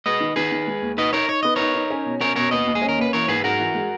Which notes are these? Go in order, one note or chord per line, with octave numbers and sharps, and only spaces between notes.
G#3 B4 D#5
D#3
D#3 G#4 B4
D#3
G#3
D#2
D#4 B4 D#5
D#4 A#4 C#5
D#4 C#5
B3 D#5
D#4 A#4 C#5
D#4
C#4
B2
C#4 A#4 C#5
B2 A#4 C#5
D#2 B4 D#5
D#2
G#4
C#4
A#4
A#3 B4
E3 A#4 C#5
G#2 G#4 B4
G#2 F#4 A#4
E3
G#3